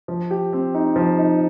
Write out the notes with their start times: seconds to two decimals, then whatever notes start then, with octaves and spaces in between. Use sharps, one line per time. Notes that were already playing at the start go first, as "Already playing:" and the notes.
0.08 F3
0.31 G4
0.53 C4
0.75 D#4
0.96 F3
1.19 D#4